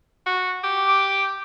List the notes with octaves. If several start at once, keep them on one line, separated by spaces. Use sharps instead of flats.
F#4
G4
D6